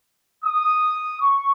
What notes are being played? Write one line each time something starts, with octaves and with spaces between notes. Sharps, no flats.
D#6
C#6